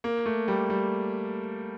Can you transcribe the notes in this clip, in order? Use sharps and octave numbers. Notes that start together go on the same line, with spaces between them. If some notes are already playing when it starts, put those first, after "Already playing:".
A#3
A3
G3
G3